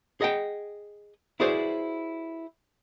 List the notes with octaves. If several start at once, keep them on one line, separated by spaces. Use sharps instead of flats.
G#4 D#5 F#5 G5
E4 F#4 G#4 B4 C5 D5